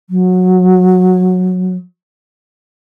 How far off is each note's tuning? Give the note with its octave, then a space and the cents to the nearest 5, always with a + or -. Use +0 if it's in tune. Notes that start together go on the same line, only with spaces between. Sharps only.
F#3 -15